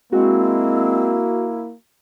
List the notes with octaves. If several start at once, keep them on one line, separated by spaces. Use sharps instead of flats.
G#3 A#3 C4 E4 F#4